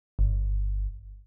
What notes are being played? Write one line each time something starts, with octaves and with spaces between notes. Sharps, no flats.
G1